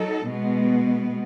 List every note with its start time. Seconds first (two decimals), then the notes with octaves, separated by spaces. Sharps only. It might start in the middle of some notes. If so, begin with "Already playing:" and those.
Already playing: F#3 D#4 A4
0.26 B2 G#3 B3